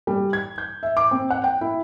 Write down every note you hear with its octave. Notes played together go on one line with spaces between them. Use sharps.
G3
G#6
G6
E5
D6
C4
F#5
G5
E4